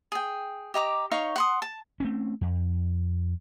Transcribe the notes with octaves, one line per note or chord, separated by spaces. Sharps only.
G#4 G5
G4 D#5 A#5 D6
D#4 C#5 F5 C#6
F#5 C6 D#6
A5
A3 C4 C#4
F2